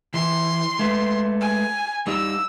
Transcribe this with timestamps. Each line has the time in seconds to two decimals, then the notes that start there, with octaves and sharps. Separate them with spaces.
0.14 E3 C6
0.79 G#3 A3 B4
1.41 G#5
2.07 G3 D#4 E6